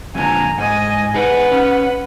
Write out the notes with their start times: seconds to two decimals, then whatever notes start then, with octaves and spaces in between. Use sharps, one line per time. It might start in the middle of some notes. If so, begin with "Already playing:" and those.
0.15 F2 A#2 D3 G#5 A#5
0.58 G#2 D#5 G#5
1.14 D#4 G#4 B4 F#5
1.52 C#4